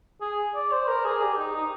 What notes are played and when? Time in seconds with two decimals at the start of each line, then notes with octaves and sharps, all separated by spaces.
0.21 G#4
0.55 D5
0.72 C5
0.88 A#4
1.05 G#4
1.22 G4
1.38 D#4
1.55 D#4